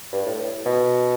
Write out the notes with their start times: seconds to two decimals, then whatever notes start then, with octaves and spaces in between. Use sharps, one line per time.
0.13 G2
0.26 A2
0.66 B2